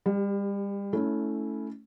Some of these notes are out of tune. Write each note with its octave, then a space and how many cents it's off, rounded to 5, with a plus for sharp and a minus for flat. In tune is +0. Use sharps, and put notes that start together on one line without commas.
G3 +35 G4 +0
A3 +0 C#4 +15 E4 -15